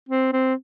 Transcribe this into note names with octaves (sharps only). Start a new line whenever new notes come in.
C4
C4